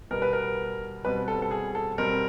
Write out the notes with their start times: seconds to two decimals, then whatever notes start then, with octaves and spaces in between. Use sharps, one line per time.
0.11 B2 G3 B3 A#4
0.22 B4
0.33 A#4
1.05 B2 G3 C4 B4
1.28 A4
1.42 A4
1.51 G#4
1.75 A4
1.98 B2 G3 C4 A#4